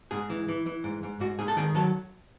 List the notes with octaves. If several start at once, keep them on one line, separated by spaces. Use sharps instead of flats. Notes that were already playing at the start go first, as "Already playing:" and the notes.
G#2 G#4
E3
E3
E3
G#2
G#2
G#2 F#4
G#2 G#4
A4
D#3 G#4
F#3 A4